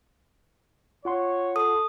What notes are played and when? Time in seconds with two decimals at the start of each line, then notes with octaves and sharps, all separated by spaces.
1.05 F4 C#5 F#5 C6
1.56 A4 D#6